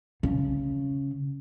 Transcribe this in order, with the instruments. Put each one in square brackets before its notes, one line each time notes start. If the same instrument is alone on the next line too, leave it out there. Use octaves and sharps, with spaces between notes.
[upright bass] C#3